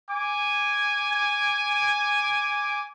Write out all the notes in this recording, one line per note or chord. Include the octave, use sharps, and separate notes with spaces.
G#5 D6